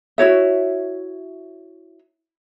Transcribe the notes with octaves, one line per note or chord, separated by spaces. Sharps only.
E4 F#4 C#5 E5